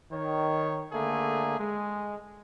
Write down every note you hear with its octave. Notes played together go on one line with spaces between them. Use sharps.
D#3 C#5
D3 A3 A#3 G#4
G#3